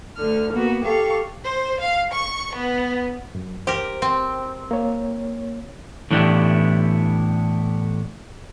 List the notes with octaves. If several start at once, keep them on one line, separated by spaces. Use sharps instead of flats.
D2 D3 F6
A#3 B3 F#4
G4 A4 F5 C#6
C5
F5
C#6
B3
F#2
G4 A#4 C5
C4
A#3 C#5
A2 E3 B3 D4 E4 G4